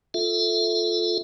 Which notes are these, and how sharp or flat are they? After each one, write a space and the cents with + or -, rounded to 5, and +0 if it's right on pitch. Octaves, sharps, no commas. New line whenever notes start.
F4 +10 A4 +0 E5 +0